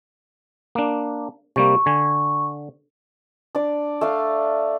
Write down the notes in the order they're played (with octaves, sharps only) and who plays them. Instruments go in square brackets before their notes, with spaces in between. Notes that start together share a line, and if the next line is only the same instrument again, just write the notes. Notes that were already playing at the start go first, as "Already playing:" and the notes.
[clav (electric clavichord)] A#3 D4
[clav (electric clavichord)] C3 G3 A#3 [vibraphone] C#6
[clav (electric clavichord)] D3 G#5
[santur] D4 D5
A3 D4 F5